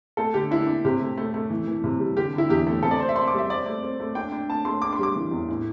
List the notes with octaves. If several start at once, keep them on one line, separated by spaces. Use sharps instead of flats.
A3 A4
D3 G4
D4 E4
D4
C3 G4
A3
A3
A3
E3
E3
C3
G3
D3 G4
D3 E4
E2 G4
A3
C3 A4
D5
C4 C5
E5
C4 C6
D6
G3 E5
C4 D5
A3
C4
A3
D4 G5
D4
A3 A5
A3 C6
D4 D6
C6
G3 D6
E3
E2
A2